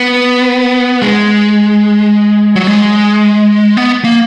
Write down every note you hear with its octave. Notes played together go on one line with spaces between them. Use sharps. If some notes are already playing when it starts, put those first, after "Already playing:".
Already playing: B3
G#3
F#3
G#3
B3
A#3